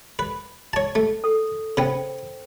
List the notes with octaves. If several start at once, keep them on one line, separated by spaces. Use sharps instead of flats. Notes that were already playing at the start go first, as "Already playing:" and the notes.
B4
C#5 A5
A3
A4
C#3 B3 C5 G5